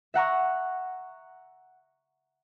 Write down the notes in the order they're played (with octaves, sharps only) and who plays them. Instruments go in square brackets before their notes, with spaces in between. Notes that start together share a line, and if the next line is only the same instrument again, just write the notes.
[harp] E5 F#5 A#5 C#6